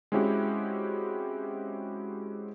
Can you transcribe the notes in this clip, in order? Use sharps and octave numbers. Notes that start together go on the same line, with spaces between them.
G#3 C4 C#4 E4 F#4 G4